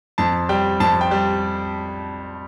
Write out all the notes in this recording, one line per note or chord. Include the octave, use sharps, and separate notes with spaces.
F2 A5
G3 G5
F2 A5
G5
G3